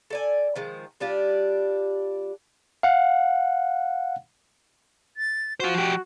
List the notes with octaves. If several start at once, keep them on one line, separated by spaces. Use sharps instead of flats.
A4 D5 G#5
D#3 F3 G#3
G3 D4 F4 G4
F5 F#5
A6
F4 F#4 C5
F3 G4